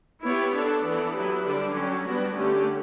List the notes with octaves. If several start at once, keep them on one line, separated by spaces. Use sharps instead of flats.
B3 E4 G4 C#5
B3 D4 A4
E3 B3 D4 A4
F#3 B3 E4 G4 B4
D3 G3 D4
F#3 C#4 G4
G3 B3 D4 F#4
D3 A3 C#4 G4